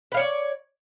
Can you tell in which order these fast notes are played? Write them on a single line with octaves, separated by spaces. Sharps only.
B4 F5 C#5 D5